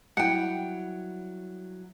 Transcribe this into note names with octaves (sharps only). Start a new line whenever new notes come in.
F#3 G3 E4 F#5 G5